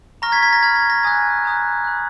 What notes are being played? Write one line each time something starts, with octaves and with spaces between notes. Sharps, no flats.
A#5 C#6 F6 A#6
G#6 B6
G#6 B6
A#6
B5 F6 G#6
G#6
A#6
G#5 D#6 F#6 G#6
A#5 D#6 F#6
B5 F#6